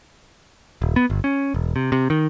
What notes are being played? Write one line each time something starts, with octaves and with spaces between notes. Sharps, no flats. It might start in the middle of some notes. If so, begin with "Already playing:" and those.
D#1
B3
G1
C#4
E1
C3
C3
D#3